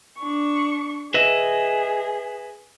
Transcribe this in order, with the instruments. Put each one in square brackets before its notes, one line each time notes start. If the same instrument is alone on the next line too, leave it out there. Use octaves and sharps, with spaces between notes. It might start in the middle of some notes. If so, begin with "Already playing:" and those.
[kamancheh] D4 C#6
[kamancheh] G#4 [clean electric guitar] B4 D#5 E5